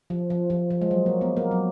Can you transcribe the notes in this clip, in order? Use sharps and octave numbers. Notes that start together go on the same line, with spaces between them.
F3
F3
F3
F3
G#3
F#3
A#3
B3
A#3
F#3